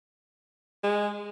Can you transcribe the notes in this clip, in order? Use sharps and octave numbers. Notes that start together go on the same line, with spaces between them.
G#3